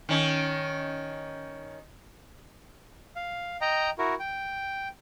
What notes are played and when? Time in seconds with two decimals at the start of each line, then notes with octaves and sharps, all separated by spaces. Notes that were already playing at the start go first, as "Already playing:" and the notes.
0.09 D#3 C#4
3.16 F5
3.61 D#5 G5 A#5
3.98 E4 F#4 A#4
4.19 G5